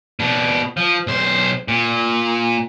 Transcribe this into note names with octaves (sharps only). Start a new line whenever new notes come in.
B2 D4
F3
B1 C5
A#2